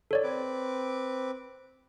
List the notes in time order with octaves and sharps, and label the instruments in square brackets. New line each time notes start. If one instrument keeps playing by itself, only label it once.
[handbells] A4 C#5 D5
[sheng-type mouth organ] C4 B4 D6